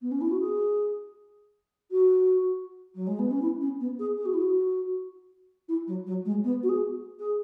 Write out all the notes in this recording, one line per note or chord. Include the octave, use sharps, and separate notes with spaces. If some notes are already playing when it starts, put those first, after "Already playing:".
B3
C#4
E4
F#4
G#4
F#4
F#3
G#3
B3
C#4
E4
C#4
B3
G#4
G#4
F#4
E4
F#4
E4
F#3
F#3
G#3
B3
F#4
G#4
G#4